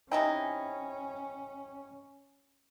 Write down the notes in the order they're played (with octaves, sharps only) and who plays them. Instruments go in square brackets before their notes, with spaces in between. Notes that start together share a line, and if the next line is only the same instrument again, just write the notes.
[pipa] C3 D#4 E4 [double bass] C#4 [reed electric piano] G5 G#5